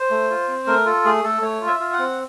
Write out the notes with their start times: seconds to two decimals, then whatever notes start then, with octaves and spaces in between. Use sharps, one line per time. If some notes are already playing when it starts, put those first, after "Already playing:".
Already playing: C5
0.11 A3
0.30 F4
0.48 C4
0.67 A3 A#4
0.85 F4 A4
1.05 A3 G#4
1.24 A3 A4
1.42 A3 C#5
1.61 F4
1.67 E5
1.79 F4
1.93 F#5
1.99 C4